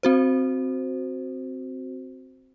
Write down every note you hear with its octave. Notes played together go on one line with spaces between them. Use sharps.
C4 F#4 C5